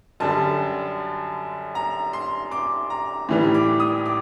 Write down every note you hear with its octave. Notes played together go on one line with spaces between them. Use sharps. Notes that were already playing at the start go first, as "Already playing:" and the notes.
F#2 D3 G3 A5
A#5
C6
D6
A#5
A2 E3 G3
D6
D#6
D6